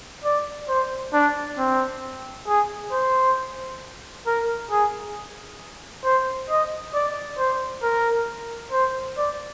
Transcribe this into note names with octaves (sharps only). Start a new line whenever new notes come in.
D5
C5
D4
C4
G#4
C5
A#4
G#4
C5
D#5
D5
C5
A#4
C5
D5